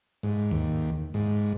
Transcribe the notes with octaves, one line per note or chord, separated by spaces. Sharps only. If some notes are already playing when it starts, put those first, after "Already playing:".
G#2
D#2
G#2